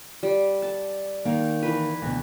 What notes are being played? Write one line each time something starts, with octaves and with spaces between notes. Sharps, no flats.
G3
A5
D#3 A#3
E3 B4
D2 B2